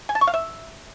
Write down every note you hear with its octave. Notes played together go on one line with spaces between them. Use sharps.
G#5
A5
C#6
F5
E5